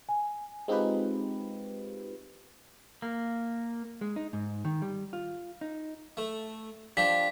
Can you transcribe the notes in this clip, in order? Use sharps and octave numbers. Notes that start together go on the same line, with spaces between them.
G#5
G#3 C4 D#4 F4 G4 B4
A#3
G#3
D#4
G#2
D#3
G3
F4
D#4
A3
F3 D4 G4 B6